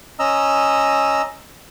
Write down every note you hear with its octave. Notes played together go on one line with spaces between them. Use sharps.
C#4 D#5 A#5 E6